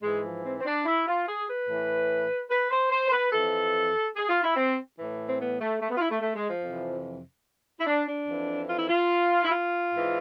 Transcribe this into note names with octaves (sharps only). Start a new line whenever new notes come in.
G#2 E3 G#3
F3
C4
C4
D4
E4
F4
G#4
B4
A2 E3
B4
C5
C5
C5
B4
F2 E3 A4
G#4
F4
E4
C4
A2 E3
C4
B3
A3
A3
B3
F4
E4
A3
A3
G#3
F3
F2 C3 E3
E4
D4
D4
F2 E3
F4
E4
F4
E4
F4
G#2 E3